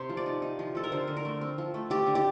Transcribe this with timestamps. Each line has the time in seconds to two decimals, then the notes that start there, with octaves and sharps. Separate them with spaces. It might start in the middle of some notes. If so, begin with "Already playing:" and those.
Already playing: C3 C5
0.09 F3
0.17 D5
0.26 D#4
0.42 D#4
0.59 F3
0.75 F3 A4
0.84 A#4
0.92 D3 C5
1.08 D3
1.17 A#4
1.25 A3
1.41 C4
1.58 F3
1.74 A3
1.90 A3 G4
2.07 D3
2.15 G4